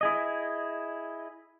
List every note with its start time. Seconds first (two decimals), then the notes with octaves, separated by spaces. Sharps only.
0.01 E4 G#4 D#5